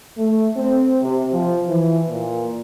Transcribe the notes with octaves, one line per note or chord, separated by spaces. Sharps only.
A3
C4
C3
F3
E3
A#2